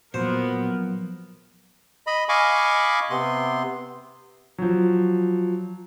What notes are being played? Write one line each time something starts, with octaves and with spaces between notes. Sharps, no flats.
A#2 F3 F#3 A#3 B3 F#4 A#4 C5
D#5 B5
D#5 F5 G#5 B5 C#6 D6
C3 B3 C6
F3 F#3